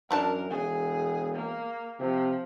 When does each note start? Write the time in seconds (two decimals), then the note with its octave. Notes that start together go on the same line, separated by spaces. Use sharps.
0.11 F#2 E3 D4 A#4 A5
0.50 E1 G#4
1.35 A#3
2.00 C3 F3